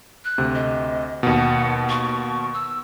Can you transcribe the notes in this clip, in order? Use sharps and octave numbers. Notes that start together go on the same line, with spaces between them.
F#6
D2 C3
D#5
D#2 B2 F#5
C#6
E6